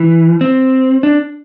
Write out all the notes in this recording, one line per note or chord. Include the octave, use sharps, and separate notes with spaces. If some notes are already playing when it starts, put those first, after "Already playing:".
Already playing: E3
C4
D4